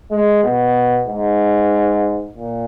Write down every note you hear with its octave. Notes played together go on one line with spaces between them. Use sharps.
G#3
B2
G#2
A#2